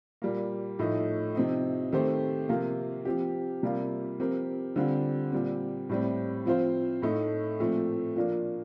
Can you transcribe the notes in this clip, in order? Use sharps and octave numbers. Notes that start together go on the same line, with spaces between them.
A#2 G3 A#3
A2 F3 A3 D#4
C3 F3 C4 D#4
D#3 A3 C4 G4 C5
C3 F3 A#3 F4
F3 C4 G4
C3 G3 A#3 F4
F3 C4 G4 A#4
D3 G3 C4 F4
A#2 G3 C4
A2 G3 C4
F3 C4 F4 C5
A2 A3 D#4
A#2 F3 A3 C4
A#2 F3 A#3 D4